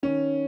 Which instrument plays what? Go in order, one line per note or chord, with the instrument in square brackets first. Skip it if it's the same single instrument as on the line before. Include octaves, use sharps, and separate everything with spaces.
[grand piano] D#3 C#4